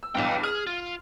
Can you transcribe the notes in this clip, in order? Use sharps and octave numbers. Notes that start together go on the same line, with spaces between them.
E6
B1 E2 G2 F5 G5
G#4 F6
F4